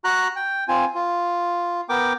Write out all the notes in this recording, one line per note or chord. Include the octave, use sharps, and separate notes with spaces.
F#4 A#5 F#6
G5
C4 F4 G#5
F4
B3 A#4 G5 D6